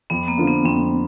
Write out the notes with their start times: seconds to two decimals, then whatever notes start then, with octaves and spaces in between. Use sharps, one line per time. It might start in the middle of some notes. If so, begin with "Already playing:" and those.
0.10 F2 B3
0.28 A#3
0.38 D3 F3
0.47 B3
0.65 F2 C4